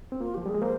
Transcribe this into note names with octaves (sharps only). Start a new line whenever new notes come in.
C4
A#3 F4
F3 G4
G3 G#4
G#3
A#3 C5